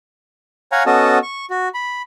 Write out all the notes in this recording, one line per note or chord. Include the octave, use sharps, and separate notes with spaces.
C#5 F5 F#5 G#5 A#5
B3 C#4 F#4 A4 D#5 A5
C#6
F#4
B5